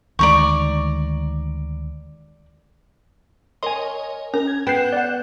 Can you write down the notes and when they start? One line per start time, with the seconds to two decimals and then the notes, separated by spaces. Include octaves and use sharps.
0.19 D2 D#3 G#3 D5 A#5 C#6
3.63 A#4 C#5 D#5 G#5 C6
4.34 C#4 A#4
4.47 G#6
4.67 B3 G5 F#6 G6 C7 E7
4.93 D5 F#5